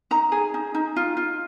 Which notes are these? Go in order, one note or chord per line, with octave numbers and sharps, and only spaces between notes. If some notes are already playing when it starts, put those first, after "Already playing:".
D#4 A#5
G#4
D#4
D#4
F4
F4